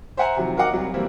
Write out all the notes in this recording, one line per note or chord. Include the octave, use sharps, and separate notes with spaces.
C5 E5 F#5 G#5 A#5
C3 D#3 F3 F#3
F#4 A#4 D#5 F5 F#5 D6
C2 F#3 G3
E3 G3 A#3 C4 E4